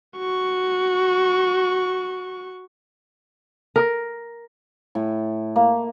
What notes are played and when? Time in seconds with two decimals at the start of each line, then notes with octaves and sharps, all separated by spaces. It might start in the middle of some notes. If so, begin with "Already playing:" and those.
0.17 F#4 C#6
3.76 A#4
4.95 A2
5.56 A#3